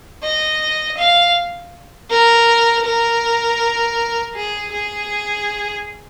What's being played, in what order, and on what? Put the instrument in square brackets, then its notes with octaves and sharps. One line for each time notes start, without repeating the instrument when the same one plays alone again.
[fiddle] D#5
F5
A#4
A#4
G#4
G#4